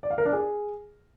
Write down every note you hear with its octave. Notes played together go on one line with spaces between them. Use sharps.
D5
F5
A#4
D4
G#4